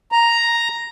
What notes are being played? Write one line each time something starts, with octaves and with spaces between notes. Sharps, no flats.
A#5